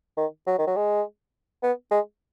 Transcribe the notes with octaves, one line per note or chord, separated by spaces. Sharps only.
D#3
F#3
D#3
F#3
G#3
B3
G#3